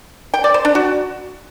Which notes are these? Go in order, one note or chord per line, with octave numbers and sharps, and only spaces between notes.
G5
D5
C5
D4
F#4